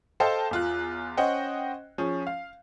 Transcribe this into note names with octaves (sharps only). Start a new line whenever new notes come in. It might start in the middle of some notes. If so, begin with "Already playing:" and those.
A4 C5 D#5 F5 G5 A5
E2 F4 F#6
C#4 C5 D#5 F#5 G5
F3 C#4 G#4
F5